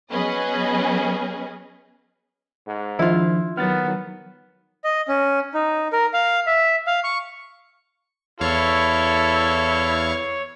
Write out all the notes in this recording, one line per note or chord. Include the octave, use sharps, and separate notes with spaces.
F#3 B3 C#4 G#4 B4 D#5
G#2
D#3 F3 D4 E4 F4
D#3 F#3 B3 F6 A6
D#5
C#4
D#4
A#4
F5
E5
F5
C#6
E2 E4 A4 C#5 F5 C#6